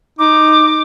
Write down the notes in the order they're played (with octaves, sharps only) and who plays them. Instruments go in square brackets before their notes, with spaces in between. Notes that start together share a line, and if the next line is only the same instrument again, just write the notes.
[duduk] D#4 [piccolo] D6